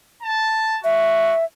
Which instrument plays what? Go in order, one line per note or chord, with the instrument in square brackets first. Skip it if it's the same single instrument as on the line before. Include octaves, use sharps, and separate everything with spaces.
[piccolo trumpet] A5
[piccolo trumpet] F#4 [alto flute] E5